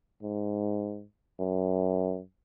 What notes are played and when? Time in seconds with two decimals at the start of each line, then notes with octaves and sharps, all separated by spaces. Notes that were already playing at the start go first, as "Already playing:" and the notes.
0.23 G#2
1.39 F#2